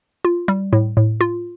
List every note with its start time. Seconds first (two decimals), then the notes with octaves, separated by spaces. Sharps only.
0.25 F4
0.48 G3
0.73 A2
0.97 A2
1.21 F4